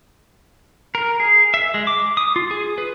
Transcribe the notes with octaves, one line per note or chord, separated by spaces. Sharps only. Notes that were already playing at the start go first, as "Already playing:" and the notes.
A#4
G#4
E5
G#3
D6
D#6
F4
G#4
B4